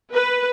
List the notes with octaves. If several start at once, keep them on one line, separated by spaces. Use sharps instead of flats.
B4